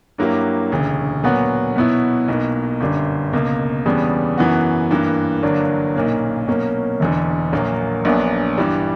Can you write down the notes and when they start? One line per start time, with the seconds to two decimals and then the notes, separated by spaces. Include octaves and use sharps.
0.18 G2 F#3 A#3 E4 G4
0.71 E1 D2 C#3
1.24 A#2 F#3 B3 F#4
1.76 B2 F#3 B3 E4
2.28 B1 B2 A#3
2.80 G1 F#2 D3 G3
3.33 C#2 B2 A#3
3.86 E2 C#3 G3 B3 D4
4.38 F#2 E3 B3 F#4
4.91 G2 E3 A#3
5.43 G1 G2 F#3 A#3 D4
5.96 B1 A#2 A#3 C#4
6.48 B2 F#3 A#3 C#4
7.00 E1 E2 D3
7.52 A#1 A#2 F#3 A#3
8.05 A#1 A#2 F#3 B3 D4
8.58 G2 E3 G3